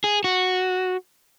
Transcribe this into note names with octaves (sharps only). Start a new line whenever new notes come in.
G#4
F#4